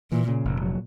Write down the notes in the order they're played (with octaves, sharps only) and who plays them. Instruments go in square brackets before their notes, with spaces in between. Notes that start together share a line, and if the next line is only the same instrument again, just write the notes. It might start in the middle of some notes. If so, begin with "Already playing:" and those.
[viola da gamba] A#2 [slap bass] E3
[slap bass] C#3
F1
F#3